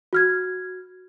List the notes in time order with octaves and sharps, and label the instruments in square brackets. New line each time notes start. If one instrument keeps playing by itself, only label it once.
[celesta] F#4 F6 G#6